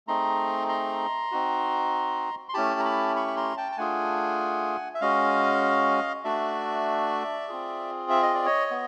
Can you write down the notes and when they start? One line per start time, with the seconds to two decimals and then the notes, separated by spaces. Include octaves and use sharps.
0.07 A3 C4 D#4 G#4 A#5 C6
0.69 A#5 C6
1.32 C4 D#4 F#4
2.49 C6
2.54 A3 C#4 E4 G4 A5 B5
2.80 A#5
2.85 A5 B5
3.16 B5 C#6
3.28 B5
3.36 A#5 C6
3.57 G5 A5
3.72 A5
3.77 A3 D4 F4 G#4 F#5 G#5
4.95 E5
5.01 G#3 C#4 F#4 D#5 F5
6.24 A3 D4 F#4 D5 E5
7.48 C4 F4 G#4
8.10 E5
8.22 D#5
8.34 D5
8.46 C#5 D#5
8.71 B3